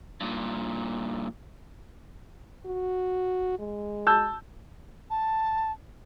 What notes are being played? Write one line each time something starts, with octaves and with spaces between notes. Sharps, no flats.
G2 A#2
F#4
G#3
A5 E6 G6
A5